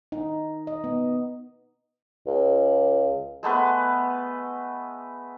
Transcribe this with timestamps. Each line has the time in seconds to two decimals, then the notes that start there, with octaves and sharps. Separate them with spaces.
0.12 D#4
0.67 D#5
0.84 B3
2.27 C#2
3.43 G#3 A3 B3 B4